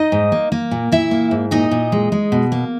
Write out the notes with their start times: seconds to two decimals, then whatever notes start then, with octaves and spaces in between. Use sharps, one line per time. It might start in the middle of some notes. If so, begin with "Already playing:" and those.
Already playing: D#4 D#5
0.12 G#2
0.32 A#3
0.52 A#3
0.71 A#2
0.92 A#2 E4 E5
1.11 A#3
1.31 G#2
1.51 A#2 D#4 D#5
1.71 A#2
1.92 G#3
2.12 G#3
2.32 B2
2.52 A#3